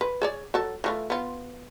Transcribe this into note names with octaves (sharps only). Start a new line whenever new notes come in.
B4
G#4 C#5 D5
F#3 A4
E3 A3 F4
B3 F4